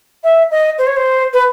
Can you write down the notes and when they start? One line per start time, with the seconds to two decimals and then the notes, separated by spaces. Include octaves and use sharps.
0.23 E5
0.51 D#5
0.78 C5
0.87 C#5
0.96 C5
1.33 B4